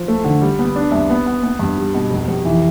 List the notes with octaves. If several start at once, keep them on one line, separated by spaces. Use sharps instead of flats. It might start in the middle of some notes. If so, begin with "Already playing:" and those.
Already playing: F3
A3
D3
G3
B3
D4
C2
B3
B3
B3
G2
G3
B2
F1
F1
E3